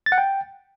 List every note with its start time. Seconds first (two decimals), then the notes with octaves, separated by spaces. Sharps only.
0.06 A6
0.12 F#5
0.18 G5